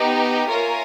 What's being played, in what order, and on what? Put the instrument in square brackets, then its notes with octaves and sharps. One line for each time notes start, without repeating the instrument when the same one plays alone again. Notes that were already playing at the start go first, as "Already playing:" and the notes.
Already playing: [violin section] B3 D#4 G4
F4 A#4 C#5 E5 G#5